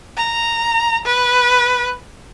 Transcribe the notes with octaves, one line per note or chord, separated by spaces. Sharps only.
A#5
B4